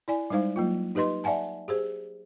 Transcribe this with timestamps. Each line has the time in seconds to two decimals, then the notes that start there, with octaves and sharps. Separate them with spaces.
0.08 E4 D5 G#5
0.30 G3 G#3 D#4 C5 F5
0.56 F#3 A#3 F4
0.95 D#4 G4 B4 D#5 C6
1.24 D5 E5 F#5 G#5 A5
1.68 G4 G#4 C5